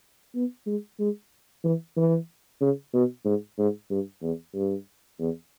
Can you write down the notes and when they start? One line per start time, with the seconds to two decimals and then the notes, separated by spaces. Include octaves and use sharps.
0.35 B3
0.67 G#3
0.99 G#3
1.64 E3
1.97 E3
2.61 C#3
2.93 B2
3.25 G#2
3.58 G#2
3.90 G2
4.22 E2
4.54 G2
5.19 E2